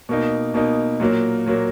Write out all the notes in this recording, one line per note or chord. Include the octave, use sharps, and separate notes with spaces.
B2 A#3 D#4
B2 A#3 D#4
A#2 F#3 A#3
A#2 F#3 A#3